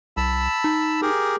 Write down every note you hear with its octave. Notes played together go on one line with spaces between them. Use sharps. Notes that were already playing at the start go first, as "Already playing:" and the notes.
C2 A5 B5 E6
D#4
G4 G#4 A#4